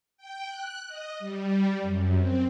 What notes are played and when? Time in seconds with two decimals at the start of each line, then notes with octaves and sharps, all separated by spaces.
0.17 G5
0.47 F#6
0.88 D#5
1.19 G3
1.82 F#2
2.17 C4